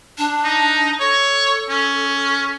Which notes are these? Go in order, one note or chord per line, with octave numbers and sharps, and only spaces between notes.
D4
D#4
A4 C#5
C#4